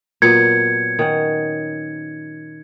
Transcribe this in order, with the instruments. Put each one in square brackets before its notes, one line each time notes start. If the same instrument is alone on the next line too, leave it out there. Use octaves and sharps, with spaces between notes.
[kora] A#2 F#3 B3 [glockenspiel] G#6 C#7
[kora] D#3 C#4 F#5